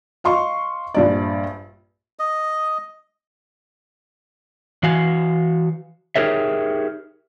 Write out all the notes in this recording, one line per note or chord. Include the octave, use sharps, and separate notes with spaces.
D#5 F5 C6 C#6
A#1 G2 D5
D#5
E3 F#4 F5 G#5
D#4 G4 G#4 A#4 C#5 E5